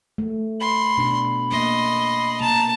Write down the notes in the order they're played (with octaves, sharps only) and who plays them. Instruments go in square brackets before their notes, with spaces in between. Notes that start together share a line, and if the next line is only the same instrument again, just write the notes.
[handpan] A3
[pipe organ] B5 [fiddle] C6
[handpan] B2 D4
[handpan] A#3 D4 [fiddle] D#5 C6
[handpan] C3 A#3 [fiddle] A5 [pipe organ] A#5